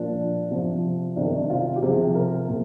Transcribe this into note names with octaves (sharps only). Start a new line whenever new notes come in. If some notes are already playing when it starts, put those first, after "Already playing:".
Already playing: A#2 F3 D4
C3 F3
C3 D#3 D4
F4
G4
C3 F3 G#4
A#4
A#2 F3